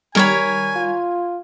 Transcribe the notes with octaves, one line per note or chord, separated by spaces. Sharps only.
D#3 G3 A#4 C#5 G#5 B5
F4